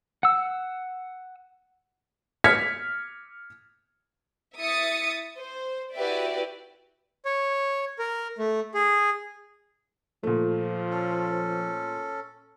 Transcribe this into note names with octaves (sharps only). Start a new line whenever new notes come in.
F#5 E6
F6 G#6 B6 C#7
E4 E5 D#6 A6 C#7
C5
E4 F#4 G4 B4 D5 E5
C#5
A#4
A3
G#4
A#2 F3 A3
C#4 A4